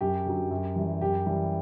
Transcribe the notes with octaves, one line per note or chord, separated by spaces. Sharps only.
F#2 G4
D3 F#3
F#2
E3 G3
F#2 G4
E3 G3